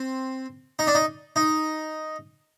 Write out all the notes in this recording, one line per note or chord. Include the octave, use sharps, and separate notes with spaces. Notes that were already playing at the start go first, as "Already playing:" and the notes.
Already playing: C4
D#4
D4
D#4
D#4